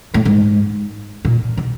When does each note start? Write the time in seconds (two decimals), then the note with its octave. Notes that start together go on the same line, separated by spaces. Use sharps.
0.14 A2
0.25 G#2
1.25 A#2
1.57 B2